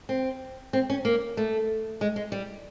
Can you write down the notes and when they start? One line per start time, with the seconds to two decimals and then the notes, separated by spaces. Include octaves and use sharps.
0.09 C4
0.73 C4
0.90 C#4
1.05 A#3
1.37 A3
2.01 G#3
2.16 G#3
2.32 G3